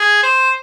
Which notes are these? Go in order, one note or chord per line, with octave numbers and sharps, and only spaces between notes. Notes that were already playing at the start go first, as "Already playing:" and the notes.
Already playing: G#4
C5